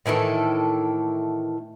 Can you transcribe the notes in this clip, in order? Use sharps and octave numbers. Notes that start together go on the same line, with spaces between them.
A2 D#3 E3 A4